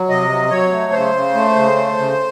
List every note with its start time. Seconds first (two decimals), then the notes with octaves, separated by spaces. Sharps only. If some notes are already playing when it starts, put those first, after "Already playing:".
Already playing: F#3
0.09 C3 D#5
0.29 F#3
0.50 F#3 C#5
0.71 A3
0.92 C#3 C5
1.14 C#3
1.35 A3
1.56 C#3
1.76 A3
1.97 C#3